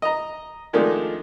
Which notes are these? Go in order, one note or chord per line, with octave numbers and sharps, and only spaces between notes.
D#5 A#5
D#3 F3 G#3 A3 D4 D#4